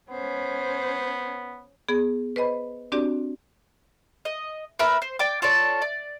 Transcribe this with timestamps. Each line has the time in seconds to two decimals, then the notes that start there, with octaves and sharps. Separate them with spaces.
0.10 B3 C#4 C5
1.89 B3 G#4
2.36 B4 C5 D#5 B5
2.92 C4 D4 F#4 G4 D5
4.25 D#5
4.79 A#4 B4 E5 B5
5.02 C5
5.19 D5 G5 D6
5.42 F4 A4 C#5 D5
5.82 D5